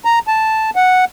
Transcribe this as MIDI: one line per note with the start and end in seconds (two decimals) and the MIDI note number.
0.05 0.19 82
0.27 0.70 81
0.76 1.05 78